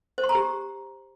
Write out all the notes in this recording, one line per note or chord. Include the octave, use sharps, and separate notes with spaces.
C5
C6
A#5
G4